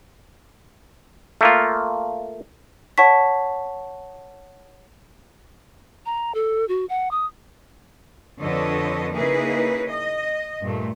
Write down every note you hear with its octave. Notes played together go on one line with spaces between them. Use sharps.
A3 A#3 F4
C#5 F#5 A5 C#6 B6
A#5
A4
F#4
F#5
D#6
F2 D3 A4 B4 C#5 D#5
C#3 A#3 D#4 E4 G#4 B4
D#5
G2 A#2 A3